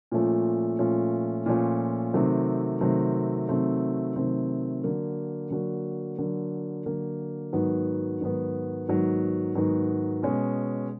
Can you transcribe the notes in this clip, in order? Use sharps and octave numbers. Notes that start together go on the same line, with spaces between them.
A#2 F3 A3 C#4 F4
A#2 F3 A3 C#4 F4
A#2 F3 A3 C#4 F4
C3 D#3 F#3 A3 C4
C3 D#3 F#3 A3 C4
C3 D#3 F#3 A3 C4
C3 D#3 F#3 A3 C4
D3 F#3 A#3
D3 F#3 A#3
D3 F#3 A#3
D3 F#3 A#3
G#2 D#3 F#3 B3
G#2 D#3 F#3 B3
G#2 D#3 F#3 B3
G#2 D#3 F#3 B3
B2 G#3 C#4